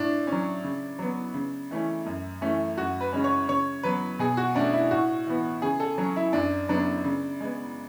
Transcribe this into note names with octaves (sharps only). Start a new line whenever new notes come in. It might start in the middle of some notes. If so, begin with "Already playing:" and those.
Already playing: A2 D4
C#4
F#3
C#3
F#3 B3
C#3
E3 A3 C#4
F#2
E3 A3 C#4
F#2 F#4
B4
C#3 G#3 C#4
C#5
C#3 C#5
F#3 B3 B4
B2 G#4
F#4
A3 C#4 D4
E4
A2 F#4
E3 B3
C#3 G#4
A4
F#3 C#4
E4
F#2 D4
C#3 F#3 B3 D4
C#3
G#3 B3